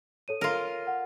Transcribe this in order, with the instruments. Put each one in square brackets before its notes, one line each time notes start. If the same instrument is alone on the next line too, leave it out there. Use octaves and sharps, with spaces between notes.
[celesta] A4 C#5 D#7
[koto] F4 A#4
[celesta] F#5